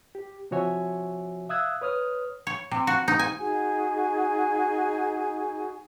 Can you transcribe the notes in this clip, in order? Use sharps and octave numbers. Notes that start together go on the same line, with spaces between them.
G4
C3 F3 F#4 C#5 E5 G#5
E5 F5 D#6 E6 F#6 G#6
B4 C#5 D#6 F6
C#5
C3
F#4
D#4
G#5
D#4 F#4 G#4 G#5